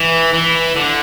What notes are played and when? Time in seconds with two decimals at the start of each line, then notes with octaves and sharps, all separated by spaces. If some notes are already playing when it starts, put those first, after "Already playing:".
Already playing: E3
0.33 E3
0.76 D3